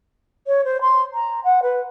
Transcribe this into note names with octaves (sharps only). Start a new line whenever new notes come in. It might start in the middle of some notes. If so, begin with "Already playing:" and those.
C#5
C5
C6
A#5
F#5
B4